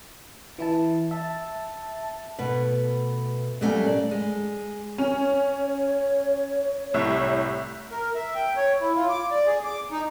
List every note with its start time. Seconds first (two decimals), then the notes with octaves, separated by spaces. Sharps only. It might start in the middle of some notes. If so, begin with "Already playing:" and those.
0.59 E3 E4 A5
1.11 E5 A5
2.39 B2 A3 B4
3.61 A#2 F#3 G3 A3 A#3 C#4
3.86 D5
4.11 G#3
4.98 C#4 C#5
6.94 C2 A2 E5
7.91 A#4
8.15 E5
8.35 G5
8.56 C#5
8.81 E4
8.95 F4
9.09 D6
9.31 D5
9.46 G#4
9.65 D6
9.91 D#4